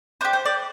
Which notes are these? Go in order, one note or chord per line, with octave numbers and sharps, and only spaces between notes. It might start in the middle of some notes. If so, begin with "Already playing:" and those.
D4 G4 C5
C5
D5